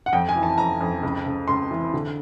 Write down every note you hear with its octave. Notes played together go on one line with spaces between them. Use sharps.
F#5
F2 G5
G#5
E3
A5
F2 A#5
F2
C#2
C#2
C#2 C6
E3
D3